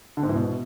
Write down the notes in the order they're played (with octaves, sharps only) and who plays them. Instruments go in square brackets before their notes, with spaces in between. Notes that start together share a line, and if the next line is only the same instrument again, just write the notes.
[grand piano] D3
G#2
E3
B2